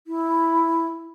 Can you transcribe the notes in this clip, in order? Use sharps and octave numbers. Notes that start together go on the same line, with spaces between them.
E4